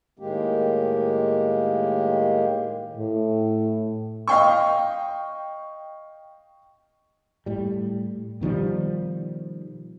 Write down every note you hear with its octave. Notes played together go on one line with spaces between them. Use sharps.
A2 D#3 G#3 A#3 G4
A2
D#5 F5 G5 C#6
A2 G3
B2 D#3 F3 G3